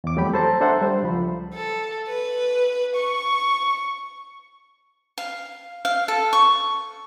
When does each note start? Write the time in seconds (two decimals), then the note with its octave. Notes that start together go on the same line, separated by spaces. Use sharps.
0.04 E2 D6
0.16 F2 F#3 G3 A3 G4 B5
0.34 A4 C5 A5 A#5
0.61 D4 A4 C5 E5 F#5
0.81 G3 C5
1.03 C#2 F3 B5
1.54 A4
2.08 B4
2.95 C#6
5.18 F5
5.85 F5
6.08 A4
6.33 C#6